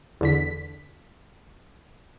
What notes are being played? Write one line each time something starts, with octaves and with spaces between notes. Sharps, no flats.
E2 D3 B6